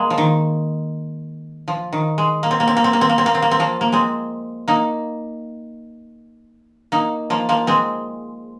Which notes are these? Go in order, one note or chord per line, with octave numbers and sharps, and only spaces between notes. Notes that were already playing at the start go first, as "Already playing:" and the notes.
Already playing: G#3 A#3
F3
D#3
F3
D#3
G#3
A#3
C4
A#3
C4
A#3
C4
A#3
C4
A#3
C4
A#3
C4
A#3
C4
F3 A#3
A#3
G#3 C4
A#3 D#4
A#3 D#4
F3 A#3
F3 A#3
G#3 C4